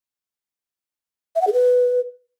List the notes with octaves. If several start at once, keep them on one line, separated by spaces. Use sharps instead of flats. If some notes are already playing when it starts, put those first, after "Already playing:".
E5
F#5
G#4
B4